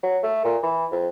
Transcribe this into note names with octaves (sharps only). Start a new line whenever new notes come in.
F#3
A3
A#2
E3
F2